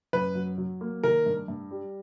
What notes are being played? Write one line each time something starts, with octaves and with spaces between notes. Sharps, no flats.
F#2 B4
F#3
F#3
A#3
D#3 A#4
G2
G2
G3